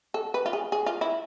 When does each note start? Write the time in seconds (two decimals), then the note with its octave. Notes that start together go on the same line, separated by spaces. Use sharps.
0.14 A4
0.34 B4
0.46 F4
0.53 G#4
0.72 G#4
0.86 F4
1.01 E4